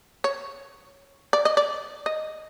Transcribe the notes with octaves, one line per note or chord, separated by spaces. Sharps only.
C#5
D5
D#5
D5
D#5